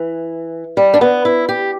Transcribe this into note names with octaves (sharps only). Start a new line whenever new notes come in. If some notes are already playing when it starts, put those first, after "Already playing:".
Already playing: E3
G3
D4
B3
E4
G4